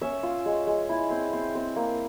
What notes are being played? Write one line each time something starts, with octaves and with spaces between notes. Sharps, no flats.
C#4 E5
F4
G#3
G#3
E4
C4
C4
C4
A#3